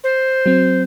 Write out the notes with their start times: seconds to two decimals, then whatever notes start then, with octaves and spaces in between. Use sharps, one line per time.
0.03 C5
0.46 F#3 C4